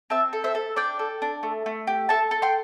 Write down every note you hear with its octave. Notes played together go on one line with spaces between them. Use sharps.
C4 E5 A5
A4
C5 E5
A4
D4 D5 G5
A4
D4
A3
A3
G4
A4 E5 A5
A4
G5 C6